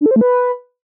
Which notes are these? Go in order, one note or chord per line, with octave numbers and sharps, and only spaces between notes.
D4
A4
C5
A3
B4